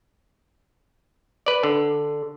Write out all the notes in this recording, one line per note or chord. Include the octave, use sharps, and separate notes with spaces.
B4 D5
D3